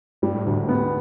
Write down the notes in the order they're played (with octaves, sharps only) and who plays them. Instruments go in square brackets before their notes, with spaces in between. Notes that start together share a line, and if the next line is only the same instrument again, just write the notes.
[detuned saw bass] G2 [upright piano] G3
[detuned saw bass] A2
[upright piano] D2 [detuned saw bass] G#2
[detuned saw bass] A2
[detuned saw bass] G#2 [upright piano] B3